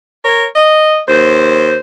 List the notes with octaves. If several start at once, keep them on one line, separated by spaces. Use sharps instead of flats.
A#4 C#5
D#5
D#2 C5